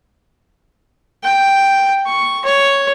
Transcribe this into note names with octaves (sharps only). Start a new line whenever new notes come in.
G5
C#6
C#5